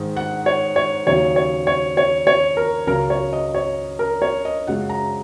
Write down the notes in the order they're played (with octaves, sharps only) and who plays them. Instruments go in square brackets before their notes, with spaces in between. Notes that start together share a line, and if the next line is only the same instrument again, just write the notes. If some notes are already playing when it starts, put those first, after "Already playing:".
Already playing: [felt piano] G#2 D#3 G#3
F#5
C#5
C#5
D#2 C#3 F#3 C#5
C#5
C#5
C#5
C#5
A#4
C#2 C#3 F#3 A#4
C#5
D#5
C#5
A#4
C#5
D#5
F#2 C#3 G#3 F#5
A#5